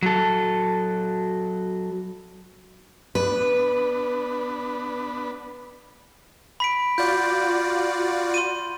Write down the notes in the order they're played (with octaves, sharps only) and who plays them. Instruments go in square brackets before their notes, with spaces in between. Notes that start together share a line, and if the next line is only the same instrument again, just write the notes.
[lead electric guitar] F#3 A4
[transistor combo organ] B3 D4 B5 [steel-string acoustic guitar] B4
[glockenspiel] B5 B6 D7
[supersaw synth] F4 F#4 D5 [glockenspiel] G6
[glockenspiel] C6 D#7